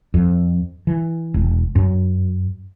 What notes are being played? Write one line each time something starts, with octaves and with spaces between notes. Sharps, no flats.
F2
E3
E1
F#2